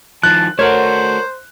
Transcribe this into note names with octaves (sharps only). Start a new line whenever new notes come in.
D#3 F3 A5 F#6
A3 F#4 A#4 C5 C#5